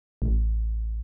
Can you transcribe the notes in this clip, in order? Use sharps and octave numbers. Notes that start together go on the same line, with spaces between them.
A1